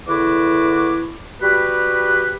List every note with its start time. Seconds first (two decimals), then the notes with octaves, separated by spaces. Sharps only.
0.06 E2 D3 E4 F#4 D6
1.41 G3 F#4 G4 B4